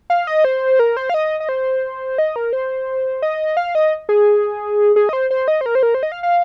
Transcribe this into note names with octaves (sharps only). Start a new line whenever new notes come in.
F5
D#5
C5
A#4
C5
F5
D#5
D#5
C5
D#5
A#4
C5
D#5
F5
D#5
G#4
G#4
D#5
C5
C5
D#5
C5
A#4
C5
A#4
C5
D#5
F5
F5